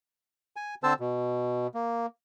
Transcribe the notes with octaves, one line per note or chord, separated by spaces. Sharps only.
G#5
D3 C4 C5 A5 E6
B2
A#3